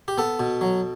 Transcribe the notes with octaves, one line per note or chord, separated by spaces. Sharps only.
G4
B3 A4
B2
F#3